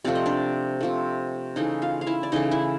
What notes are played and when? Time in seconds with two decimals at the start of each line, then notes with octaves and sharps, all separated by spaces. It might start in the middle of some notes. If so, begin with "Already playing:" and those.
0.04 C3 F3 A3 D5
0.15 D#5
0.26 D4 D5
0.80 C3 F3 A3
1.56 C#3 E3 A3 D#4 D#5
1.82 F4 F5
2.01 F5
2.06 E4 E5
2.23 D5
2.32 C#3 E3 A3 D#4 D#5
2.51 E4 E5